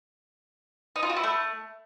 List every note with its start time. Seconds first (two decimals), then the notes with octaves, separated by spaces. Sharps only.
0.96 D#4
1.03 F4
1.10 F#4
1.17 E4
1.24 A3